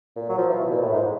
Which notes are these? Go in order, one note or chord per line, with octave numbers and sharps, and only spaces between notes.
A#2
F#3
F3
E3
B2
A#2
A2
G#2